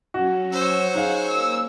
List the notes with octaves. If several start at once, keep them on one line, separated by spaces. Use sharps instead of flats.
F#3 C#4 F#4
C5 C#5 E6
D#4 G#4 F5 F#5 C#6 E6
A#3 E6